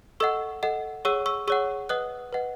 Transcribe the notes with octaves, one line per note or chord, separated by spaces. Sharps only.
A4 D#5 F#5 C#6 E6
A4 D#5 F#5
G#4 C#5 F#5 C#6 E6
C#6 E6
G#4 C#5 F#5 C#6 E6
B4 D#5 F#5 D#6 F#6
B4 D#5 F#5